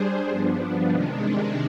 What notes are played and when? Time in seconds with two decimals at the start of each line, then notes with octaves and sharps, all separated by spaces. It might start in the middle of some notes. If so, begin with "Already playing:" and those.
Already playing: G3 D4 G#4 C5
0.28 G2 F3 B3 D4
0.88 C3 D#3 G#3 D4